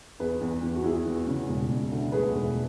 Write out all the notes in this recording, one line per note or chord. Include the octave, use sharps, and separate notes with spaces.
E2 G#4 B4
E2
E2
F#4
E2 E4 G#4
E2
C#3
E1
E1
D2
A3 G#4 B4
E1